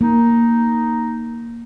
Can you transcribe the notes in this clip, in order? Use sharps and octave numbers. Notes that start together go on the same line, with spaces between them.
A#3 D#4